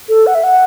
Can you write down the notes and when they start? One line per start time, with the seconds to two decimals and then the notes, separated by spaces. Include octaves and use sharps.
0.09 A4
0.27 F#5
0.35 E5
0.44 F#5